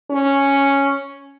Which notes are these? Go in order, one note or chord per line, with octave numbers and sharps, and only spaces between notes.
C#4